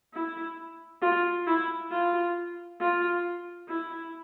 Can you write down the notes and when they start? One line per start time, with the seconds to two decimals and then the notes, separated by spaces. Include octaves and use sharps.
0.14 E4
1.02 F4
1.47 E4
1.91 F4
2.80 F4
3.69 E4